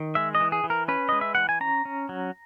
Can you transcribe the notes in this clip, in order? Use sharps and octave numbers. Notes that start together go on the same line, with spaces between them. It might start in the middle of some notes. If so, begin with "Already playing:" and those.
Already playing: D#3
G#3 E5
D#5
E3
G#4
E3
A#4
C#4 B4
G#3 D#5
E5
E3 F#5
G#5
C#4 A#5
C#4
F#3